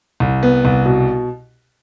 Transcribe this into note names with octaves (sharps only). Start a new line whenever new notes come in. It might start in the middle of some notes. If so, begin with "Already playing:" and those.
C2
B3
C2
B2